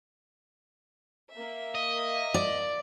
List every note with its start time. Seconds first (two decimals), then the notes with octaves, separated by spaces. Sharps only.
1.33 A#3 E5
1.75 D#5
2.34 D5